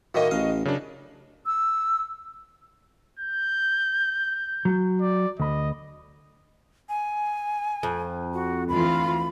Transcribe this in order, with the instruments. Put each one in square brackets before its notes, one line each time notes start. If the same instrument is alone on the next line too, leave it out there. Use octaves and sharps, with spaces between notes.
[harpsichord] A2 D#3 A#3 [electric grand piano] F#4 D#5
[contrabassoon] A1 [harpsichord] F5
[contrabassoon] F#2 [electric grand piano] C#3 D4
[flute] E6
[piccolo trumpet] G6
[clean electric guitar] F#3
[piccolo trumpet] D5
[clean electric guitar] D2 B5 [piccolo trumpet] D#5
[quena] G#5
[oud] F2
[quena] F#4
[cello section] D2 E3 F4 [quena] B5